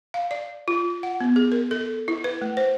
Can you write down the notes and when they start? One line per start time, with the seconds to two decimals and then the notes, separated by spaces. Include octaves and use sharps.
0.14 F5
0.31 D5
0.68 F4
1.03 F#5
1.21 B3
1.36 G#4
1.52 A#4
1.71 A4
2.08 E4
2.24 B4
2.42 A3
2.57 C5